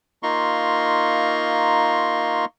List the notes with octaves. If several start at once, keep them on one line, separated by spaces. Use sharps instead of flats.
A#3 D#4 F4 A#5 C6 C#6